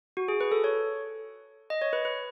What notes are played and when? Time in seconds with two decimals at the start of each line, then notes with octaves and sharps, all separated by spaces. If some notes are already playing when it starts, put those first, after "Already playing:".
0.17 F#4
0.28 G#4
0.41 B4
0.52 A4
0.64 C#5
1.70 D#5
1.82 C#5
1.93 B4
2.05 B4